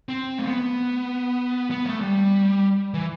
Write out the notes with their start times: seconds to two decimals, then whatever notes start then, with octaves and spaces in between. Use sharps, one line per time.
0.09 C4
0.39 A3
0.47 B3
1.71 B3
1.86 A3
2.01 G3
2.94 E3